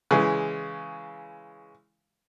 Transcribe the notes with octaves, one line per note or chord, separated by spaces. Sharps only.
C#3 E3 G#3